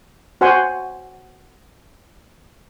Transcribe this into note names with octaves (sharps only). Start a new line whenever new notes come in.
F#4 C5 F#5 G#5 C6